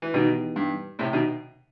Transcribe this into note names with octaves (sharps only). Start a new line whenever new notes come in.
E3
B2 D#3 E3 B3 D#4 G4
G2
A2 C3
B2 D#3